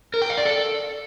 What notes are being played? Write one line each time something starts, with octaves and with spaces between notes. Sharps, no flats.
A#4
G5
F5
D5
A4